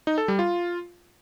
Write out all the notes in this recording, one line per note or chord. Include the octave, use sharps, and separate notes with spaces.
D#4
A4
G3
F4